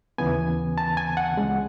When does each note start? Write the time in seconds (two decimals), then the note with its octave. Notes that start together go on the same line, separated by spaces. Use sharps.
0.18 D#2 C#3 E3 B3 G#5
0.78 A5
0.97 G#5
1.17 F#5
1.37 C#2 C#3 G#3